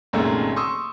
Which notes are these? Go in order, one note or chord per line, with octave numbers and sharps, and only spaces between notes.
C2 F#2 A#2 D#3 G#3 A3
C6 C#6 D#6 E6